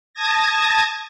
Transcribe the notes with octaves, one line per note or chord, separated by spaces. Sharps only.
A5 D#6 G#6 A#6